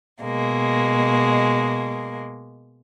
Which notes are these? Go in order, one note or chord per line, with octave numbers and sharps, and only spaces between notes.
B2 G#3 A#3